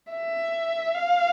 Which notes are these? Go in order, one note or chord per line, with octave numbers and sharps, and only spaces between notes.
E5
F5